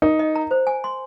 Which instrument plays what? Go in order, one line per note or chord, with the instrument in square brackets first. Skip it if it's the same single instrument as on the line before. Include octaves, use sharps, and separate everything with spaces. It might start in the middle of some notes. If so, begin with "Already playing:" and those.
[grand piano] D#4 [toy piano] A#4
[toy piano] D#5
A#5
C5
G#5
C6